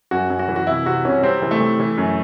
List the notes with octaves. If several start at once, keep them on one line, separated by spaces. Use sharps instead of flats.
F#2 F#4
F#2
F#4
E3
F#4
C2 E4
C3 F#4
C2 C#4
C3 C4
E3
A3
E3
E3
F#2